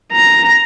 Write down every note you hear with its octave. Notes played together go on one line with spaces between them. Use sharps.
A#5